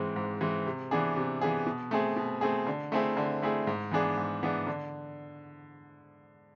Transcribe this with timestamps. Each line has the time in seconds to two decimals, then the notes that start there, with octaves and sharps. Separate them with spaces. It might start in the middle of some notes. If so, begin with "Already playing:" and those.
Already playing: G#2 E3 G#3 C4
0.16 G#2
0.41 E3 G#3 C4
0.66 C3
0.91 E3 B3 D4 G#4
1.17 C3
1.41 E3 B3 D4 G#4
1.67 B2
1.91 A3 C4 G#4
2.16 B2
2.41 A3 C4 G#4
2.67 D3
2.92 A3 C4 E4 G#4
3.17 D3
3.42 A3 C4 E4 G#4
3.67 G#2
3.91 E3 B3 D4 G#4
4.17 G#2
4.43 E3 B3 D4 G#4
4.67 D3